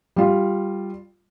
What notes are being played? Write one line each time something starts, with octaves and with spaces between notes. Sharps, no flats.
G3 F4